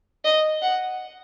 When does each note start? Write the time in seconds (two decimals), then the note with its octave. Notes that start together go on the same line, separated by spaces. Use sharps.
0.25 D#5
0.62 F#5